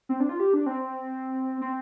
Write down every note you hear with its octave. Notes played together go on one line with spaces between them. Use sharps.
C4
D4
F4
G4
D4
C4
C4